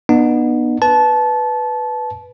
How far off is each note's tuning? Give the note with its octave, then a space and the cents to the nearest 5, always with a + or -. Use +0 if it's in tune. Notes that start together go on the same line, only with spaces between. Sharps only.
B3 -20 D#4 -45
B4 +0 A5 -20